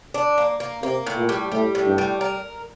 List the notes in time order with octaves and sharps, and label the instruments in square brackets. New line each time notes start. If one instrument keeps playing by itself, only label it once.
[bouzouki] D4
A#3
A#3
[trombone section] C3 [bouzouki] A#3
[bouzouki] A2
[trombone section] A#2
[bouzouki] G3
[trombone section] A2 [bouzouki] G3
[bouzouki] A2
[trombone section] G2
[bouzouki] G3
A#4